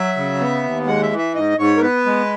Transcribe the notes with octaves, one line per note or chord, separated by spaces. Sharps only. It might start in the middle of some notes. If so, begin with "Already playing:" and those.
Already playing: F#3 E5
C#3
B3
D#2
G#3 F#5
E5
E3
E5
G#2 D#5
G#2 C#5
A#4
B3 B4
G#3